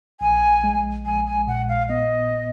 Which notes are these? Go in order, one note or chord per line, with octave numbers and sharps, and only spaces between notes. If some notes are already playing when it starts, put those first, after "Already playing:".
A#1 G#5
G#3
A#1 G#5
G#5
A#2 F#5
F5
B3 D#5
B3